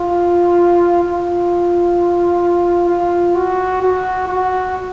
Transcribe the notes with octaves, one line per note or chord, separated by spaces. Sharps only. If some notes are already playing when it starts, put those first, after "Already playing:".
Already playing: F4
F4
F4
F#4
F#4
F#4